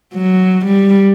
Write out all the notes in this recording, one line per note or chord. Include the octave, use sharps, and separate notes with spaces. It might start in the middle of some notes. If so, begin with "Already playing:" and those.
F#3
G3